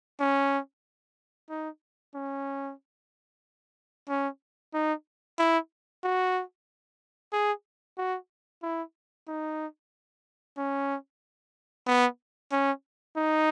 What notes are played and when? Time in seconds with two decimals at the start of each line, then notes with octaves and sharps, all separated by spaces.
0.20 C#4
1.50 D#4
2.15 C#4
4.09 C#4
4.74 D#4
5.39 E4
6.04 F#4
7.33 G#4
7.98 F#4
8.63 E4
9.28 D#4
10.57 C#4
11.87 B3
12.52 C#4
13.17 D#4